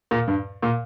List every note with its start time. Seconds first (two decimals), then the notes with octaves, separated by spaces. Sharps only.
0.11 A#2
0.27 G2
0.62 A#2